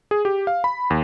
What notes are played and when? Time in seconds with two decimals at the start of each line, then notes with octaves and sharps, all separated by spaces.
0.11 G#4
0.25 G4
0.47 F5
0.64 B5
0.90 D#2